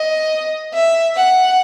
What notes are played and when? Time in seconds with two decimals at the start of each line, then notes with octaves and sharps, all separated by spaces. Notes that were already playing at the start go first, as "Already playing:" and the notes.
Already playing: D#5
0.74 E5
1.16 F#5